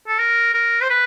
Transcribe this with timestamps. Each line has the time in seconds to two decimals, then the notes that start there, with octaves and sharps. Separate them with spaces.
0.07 A4
0.19 A#4
0.54 A#4
0.82 C5
0.90 B4